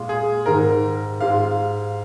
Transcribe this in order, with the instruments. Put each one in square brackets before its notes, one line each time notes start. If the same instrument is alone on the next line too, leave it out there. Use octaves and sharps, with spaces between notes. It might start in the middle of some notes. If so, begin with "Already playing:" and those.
Already playing: [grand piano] A#2 G#3 F4
[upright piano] G#4
[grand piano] G#2 D#3 G#3 D#4 [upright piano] A#4
[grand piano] G#2 G#3 F4 [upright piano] F5